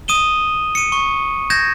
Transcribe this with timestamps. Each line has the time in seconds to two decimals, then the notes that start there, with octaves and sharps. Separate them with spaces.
0.08 D#6 D#7 E7 G7
0.75 C#7 D#7
0.92 C#6
1.50 G6 G#6 A#6 E7